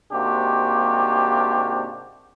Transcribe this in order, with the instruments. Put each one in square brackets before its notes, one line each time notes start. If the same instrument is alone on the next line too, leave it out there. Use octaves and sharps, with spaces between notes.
[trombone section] G#2 C3 A#3 D4 F#4 G4